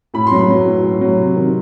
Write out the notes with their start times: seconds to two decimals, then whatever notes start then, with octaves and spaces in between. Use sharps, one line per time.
0.14 A2 B5
0.27 C6
0.32 F#3
0.40 B5
0.48 F#3
0.66 A2
0.83 A2
1.01 F#3
1.17 C3
1.35 D#3